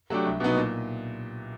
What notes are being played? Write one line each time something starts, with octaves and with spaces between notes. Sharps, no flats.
F#3 A3 D4 G4
C2
B2 F#3 B3 D#4
A#2